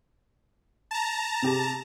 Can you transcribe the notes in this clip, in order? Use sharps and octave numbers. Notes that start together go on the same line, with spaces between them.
A5 A#5
C3 G4 G#4